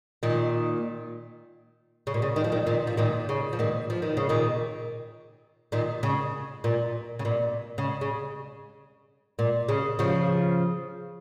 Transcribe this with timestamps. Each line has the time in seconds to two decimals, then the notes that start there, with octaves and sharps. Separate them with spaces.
0.23 A#2 D#3
2.07 C#3
2.14 A#2
2.22 C#3
2.36 D#3
2.44 F3
2.52 A#2 D#3
2.67 A#2 D#3
2.87 F3
2.97 A#2 D#3
3.29 C#3
3.53 F3
3.59 A#2 D#3
3.90 F3
4.02 D#3
4.17 C#3
4.29 A#2 D#3
5.72 A#2 D#3
6.03 C#3
6.64 A#2
7.19 C#3
7.25 A#2
7.78 C#3
8.01 C#3
9.39 A#2
9.69 C#3
9.99 C#3 F3